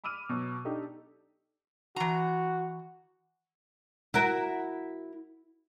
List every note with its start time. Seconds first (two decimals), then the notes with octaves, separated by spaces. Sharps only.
0.04 B5 D6 E6 F6 D#7
0.29 B2 F#3
0.65 D4 D#4 G4 A4
1.96 E3 F#4 A#5
4.14 E4 F#4 A#4